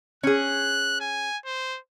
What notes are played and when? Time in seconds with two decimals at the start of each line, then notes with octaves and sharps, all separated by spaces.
0.23 C#4 G#4 F#6
1.00 G#5
1.46 C5